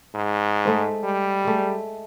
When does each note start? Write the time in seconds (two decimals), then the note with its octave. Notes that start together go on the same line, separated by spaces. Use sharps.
0.15 G#2
0.65 G#3 A3 C5
1.04 G3
1.45 G#3 A3